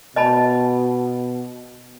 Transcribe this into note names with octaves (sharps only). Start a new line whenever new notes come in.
B2 D#5 A5 B5